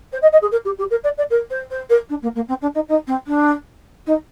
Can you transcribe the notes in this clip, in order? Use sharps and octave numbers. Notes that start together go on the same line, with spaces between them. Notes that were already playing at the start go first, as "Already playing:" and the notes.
C5
D#5
D#5
G#4
A#4
G4
G4
A#4
D5
D5
A#4
C5
C5
A#4
D4
A#3
A#3
C4
D4
D#4
D#4
C4
D4
D#4